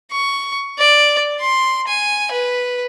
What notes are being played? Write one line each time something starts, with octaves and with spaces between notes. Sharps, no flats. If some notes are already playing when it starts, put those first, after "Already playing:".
C#6
D5
C6
G#5
B4